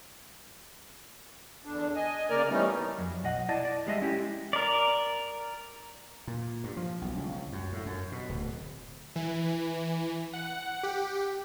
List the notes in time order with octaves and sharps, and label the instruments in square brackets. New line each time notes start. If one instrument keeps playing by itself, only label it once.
[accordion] E2 D3 D4
D#5 G#5
C#3 A#3 A#4 D5 F6
E3 G3 A3 B3 C#4 D#4
[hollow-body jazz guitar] F2 F#3
B1 D#5 F#5
E4 D5 D#5 A5
D5
G3 G#3 D#5 E5
C#4 E4 G4
[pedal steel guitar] A#4 D5
[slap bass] A#2
G2
F3
B1
C#2
F#2
A2
F#2
B2
D1
[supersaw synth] E3
F#5
G4